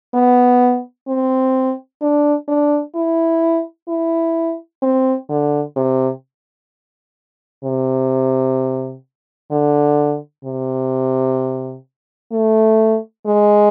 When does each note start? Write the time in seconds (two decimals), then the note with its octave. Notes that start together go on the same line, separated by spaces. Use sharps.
0.14 B3
1.08 C4
2.02 D4
2.48 D4
2.95 E4
3.88 E4
4.82 C4
5.29 D3
5.76 C3
7.64 C3
9.51 D3
10.45 C3
12.32 A3
13.26 G#3